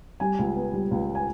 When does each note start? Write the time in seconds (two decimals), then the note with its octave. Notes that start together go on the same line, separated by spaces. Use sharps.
0.20 G3 G#5
0.39 C#2
0.56 B3
0.74 G3
0.91 C#2
1.15 G#5